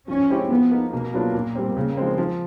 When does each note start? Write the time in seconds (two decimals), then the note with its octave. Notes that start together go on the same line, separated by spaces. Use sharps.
0.08 F3 C#4
0.30 G#3 C4 E4 G4
0.50 F3 B3
0.71 A#3 D#4
0.92 B2 A#3
1.14 F#3 B3 D4 F4
1.35 A#2
1.55 G3 C4
1.76 C#3 A#3
1.97 F3 G#3 C4
2.18 F3